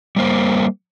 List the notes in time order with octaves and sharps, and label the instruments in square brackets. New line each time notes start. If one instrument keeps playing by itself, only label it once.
[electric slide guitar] G3 A#3 C5